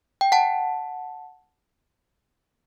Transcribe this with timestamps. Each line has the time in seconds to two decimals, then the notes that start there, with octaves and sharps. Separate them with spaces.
0.21 G5
0.32 F#5 A5